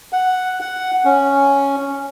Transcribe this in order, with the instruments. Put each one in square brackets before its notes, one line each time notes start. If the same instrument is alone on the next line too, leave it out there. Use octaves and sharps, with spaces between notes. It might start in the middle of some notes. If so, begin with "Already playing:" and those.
[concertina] F#5
F#5
C#4